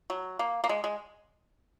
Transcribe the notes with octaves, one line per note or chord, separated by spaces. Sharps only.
F#3
A#3
A#3
G#3
G#3